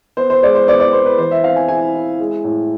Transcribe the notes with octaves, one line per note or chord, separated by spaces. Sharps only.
B3 C5
C5
G#3 D5
C5
B3 D5
D5
B3 C5
B4
E3 C5
E5
C4 F5
G#5
E4 G#5
E4
G#3
A2